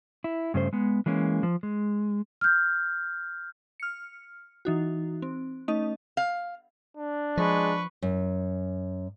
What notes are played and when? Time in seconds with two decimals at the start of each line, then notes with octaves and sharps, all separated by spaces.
0.24 E4
0.54 G2 C#3 A3 C5
0.73 G#3 B3
1.06 E3 G#3 A#3 C#4
1.43 F3
1.63 G#3
2.41 F6 G6
3.80 F6 C#7
4.65 E3 D#4 F#4
5.22 C4
5.68 A3 C#4 D#4 D#5
6.17 F5
6.97 D4
7.37 F3 G#3 B4 C#6
8.02 F#2